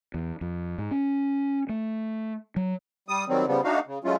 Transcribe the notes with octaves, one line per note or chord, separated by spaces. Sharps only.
E2
F2
G#2
C#4
A3
F#3
G3 D#6
D#3 F#3 G3 C4
C#3 F3 G3 B3
A3 D4 D#4 F#4 F5
C#3
F#3 G#3 A3 C#4 F4